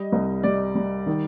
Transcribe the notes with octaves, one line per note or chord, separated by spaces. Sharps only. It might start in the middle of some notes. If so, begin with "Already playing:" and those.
Already playing: G3 D#5
C2
G3 D5
G3
D#3